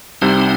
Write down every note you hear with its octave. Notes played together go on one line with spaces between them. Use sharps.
C2 C3 G3 C4 D#4